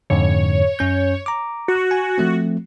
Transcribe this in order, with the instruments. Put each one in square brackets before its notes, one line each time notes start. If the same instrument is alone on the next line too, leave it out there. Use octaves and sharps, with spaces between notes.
[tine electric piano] F2 G#2 D3 [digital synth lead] C#5
[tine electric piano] F#2 C#4 G6
A#5 D6
[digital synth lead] F#4
[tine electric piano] G#5
F3 A3 C4